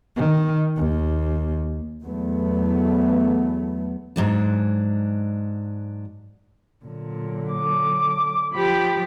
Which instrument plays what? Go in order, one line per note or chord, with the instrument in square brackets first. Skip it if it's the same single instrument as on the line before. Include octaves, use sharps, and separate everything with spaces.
[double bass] D#3
D#2
[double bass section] E2 F#3 A3 B3
[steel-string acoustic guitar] G#2 F#3 D4
[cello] A#2 [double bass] D3 F#3
[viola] D6
[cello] F3 G4 [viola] B5